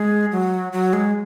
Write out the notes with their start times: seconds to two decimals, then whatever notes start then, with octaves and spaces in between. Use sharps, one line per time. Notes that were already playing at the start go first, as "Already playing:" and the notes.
Already playing: G#3
0.32 F#3
0.72 F#3
0.93 G#3